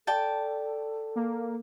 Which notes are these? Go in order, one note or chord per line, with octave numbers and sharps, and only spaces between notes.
A4 D5 G5 A5
A#3